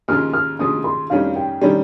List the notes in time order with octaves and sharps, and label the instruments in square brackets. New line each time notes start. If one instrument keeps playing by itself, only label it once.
[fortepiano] D#2 C#3 F3 [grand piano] F6
[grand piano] F6
[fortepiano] D#2 C#3 F3 [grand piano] D#6
[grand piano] C6
[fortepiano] F2 D#3 G3 C#4 [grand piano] F5
[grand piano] G5
[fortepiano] D#3 G3 C#4